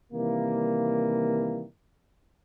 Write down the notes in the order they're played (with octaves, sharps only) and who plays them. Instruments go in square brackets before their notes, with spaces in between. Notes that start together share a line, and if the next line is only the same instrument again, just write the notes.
[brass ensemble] C3 D#3 E3 G3 A#3